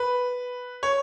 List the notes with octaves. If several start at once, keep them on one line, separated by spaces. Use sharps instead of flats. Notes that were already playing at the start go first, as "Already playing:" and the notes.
Already playing: B4
C#5